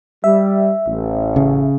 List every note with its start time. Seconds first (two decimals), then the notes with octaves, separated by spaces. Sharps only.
0.24 G3 E5
0.87 A1
1.36 C#3